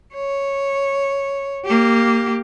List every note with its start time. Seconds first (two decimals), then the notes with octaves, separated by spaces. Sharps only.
0.15 C#5
1.65 A#3 G4